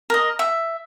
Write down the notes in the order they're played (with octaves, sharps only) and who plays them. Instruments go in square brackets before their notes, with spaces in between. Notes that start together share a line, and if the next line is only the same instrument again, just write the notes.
[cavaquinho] A#4 D#5
E5